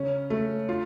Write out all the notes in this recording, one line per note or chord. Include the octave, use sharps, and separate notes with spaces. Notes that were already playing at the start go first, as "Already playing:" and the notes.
Already playing: C#3 C#4
A3
F4